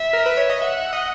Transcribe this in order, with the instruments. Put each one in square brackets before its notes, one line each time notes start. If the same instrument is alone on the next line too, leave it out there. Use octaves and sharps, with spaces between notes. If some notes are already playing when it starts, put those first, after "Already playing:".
Already playing: [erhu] E5
[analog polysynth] A#4
B4
C#5
D#5
[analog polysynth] E5 [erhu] F#5
[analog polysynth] E5
D#5